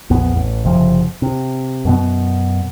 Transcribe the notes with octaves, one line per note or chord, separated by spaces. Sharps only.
A#1 E2 B3
A1
F#1 C3 F3
C3
F#2 B2 B3